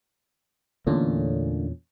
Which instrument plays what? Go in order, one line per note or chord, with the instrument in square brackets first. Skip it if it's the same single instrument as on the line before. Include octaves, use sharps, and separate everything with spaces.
[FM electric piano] E2 A#2 C#4 [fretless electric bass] D3 A3 A#3